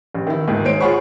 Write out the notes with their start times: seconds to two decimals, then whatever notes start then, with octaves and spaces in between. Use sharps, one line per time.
0.14 A1
0.27 D#3 E4
0.47 D2 G#2 D#3
0.64 G#3 C5 C#5 D7
0.80 F4 G#4 C#5 F#5 B5 C#6